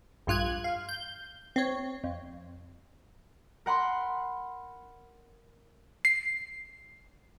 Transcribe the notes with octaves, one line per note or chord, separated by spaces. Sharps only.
A#1 G2 F4 F#6 G#6
F5
G6
C4 C#5
F2
A#4 F#5 B5 C6
C7